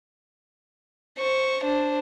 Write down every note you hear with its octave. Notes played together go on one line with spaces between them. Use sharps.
C5 C#6
D4 C5